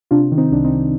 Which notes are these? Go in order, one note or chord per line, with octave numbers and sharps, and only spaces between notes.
C3 D4 F4
D#3
C4 D#4
C2 D4
C4 D#4
C2